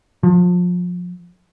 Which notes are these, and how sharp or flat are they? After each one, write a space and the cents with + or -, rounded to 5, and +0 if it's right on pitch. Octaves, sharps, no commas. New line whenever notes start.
F3 +30